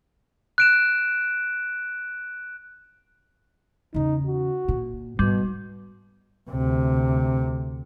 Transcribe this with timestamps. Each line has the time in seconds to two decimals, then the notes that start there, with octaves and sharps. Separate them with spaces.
0.58 F#6 D7 E7
3.94 E2 C#3 D#4
4.27 F#4
4.68 A#2
5.19 G#2 B2 G3
6.50 D2 C3